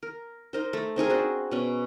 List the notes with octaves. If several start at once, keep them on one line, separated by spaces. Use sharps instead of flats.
A#4
D#4 A#4 C5
A3
C4 D#4 G#4 A#4
D4 F#4 C5
B2 C#4